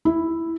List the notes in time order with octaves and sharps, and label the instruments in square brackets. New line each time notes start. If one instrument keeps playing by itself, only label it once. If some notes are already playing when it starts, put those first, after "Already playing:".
[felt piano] E4